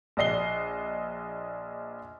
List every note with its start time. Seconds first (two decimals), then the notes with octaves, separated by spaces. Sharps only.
0.17 A#1 D5 D#5 C7 G7